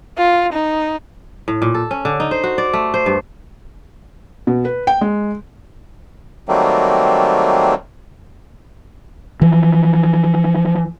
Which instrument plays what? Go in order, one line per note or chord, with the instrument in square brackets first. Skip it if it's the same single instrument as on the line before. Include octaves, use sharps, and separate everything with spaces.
[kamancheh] F4
D#4
[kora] A2
A#2
A4
C#4
D3
D#4
C5
F#4
D5
A3
C5
G2
[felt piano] B2
B4
G5
G#3
[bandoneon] D#3 F#3 G3 A3 A#3 C4
[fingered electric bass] E3 F3